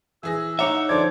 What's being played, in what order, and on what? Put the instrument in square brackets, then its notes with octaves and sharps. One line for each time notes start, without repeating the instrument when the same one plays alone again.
[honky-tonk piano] E3 G#4 A#6 [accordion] E6
[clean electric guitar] D#4 C#5 E5 [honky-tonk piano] F#5 A#5 D6
[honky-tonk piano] D3 F3 G#6 [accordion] C5 D5 D6